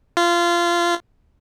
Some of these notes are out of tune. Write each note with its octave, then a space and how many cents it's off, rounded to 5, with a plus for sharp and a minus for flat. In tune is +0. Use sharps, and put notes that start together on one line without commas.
F4 -20